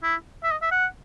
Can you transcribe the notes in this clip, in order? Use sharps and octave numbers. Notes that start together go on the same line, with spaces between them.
E4
E5
D#5
E5
F#5